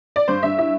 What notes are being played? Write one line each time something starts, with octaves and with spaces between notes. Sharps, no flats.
D5
G2 C5
G2 E5
E4 E5